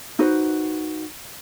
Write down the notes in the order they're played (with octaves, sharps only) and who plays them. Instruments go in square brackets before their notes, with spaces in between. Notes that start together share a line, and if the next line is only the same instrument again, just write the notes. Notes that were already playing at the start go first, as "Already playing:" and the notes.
[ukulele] D#4 F#4 B4 C5